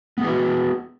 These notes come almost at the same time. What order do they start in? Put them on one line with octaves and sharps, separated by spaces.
B3 G#4 B4 F#4